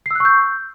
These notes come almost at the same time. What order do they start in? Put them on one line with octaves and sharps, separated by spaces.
C7 E6 F#6 C#6 G6